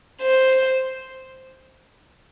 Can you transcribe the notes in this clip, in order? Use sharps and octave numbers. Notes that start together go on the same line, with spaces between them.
C5